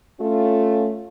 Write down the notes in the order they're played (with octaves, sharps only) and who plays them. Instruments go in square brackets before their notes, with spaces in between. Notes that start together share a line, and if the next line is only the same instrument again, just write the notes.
[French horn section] A3 C#4 F4